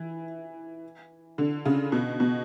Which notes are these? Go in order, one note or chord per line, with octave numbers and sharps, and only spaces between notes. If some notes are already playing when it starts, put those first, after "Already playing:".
Already playing: E3
D3
C#3
B2
B2